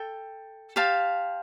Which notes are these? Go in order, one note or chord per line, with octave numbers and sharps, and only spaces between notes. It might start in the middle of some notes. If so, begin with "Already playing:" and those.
Already playing: A4 G5
G4 C5 F5 A5